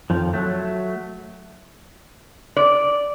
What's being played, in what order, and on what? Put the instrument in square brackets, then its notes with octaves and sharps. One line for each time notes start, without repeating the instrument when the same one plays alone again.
[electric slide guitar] F2 D#3 F3
F#3 A3
[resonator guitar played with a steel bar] D5